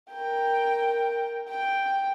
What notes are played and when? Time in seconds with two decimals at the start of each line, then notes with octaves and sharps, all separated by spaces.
0.11 A#4 G5
1.49 G5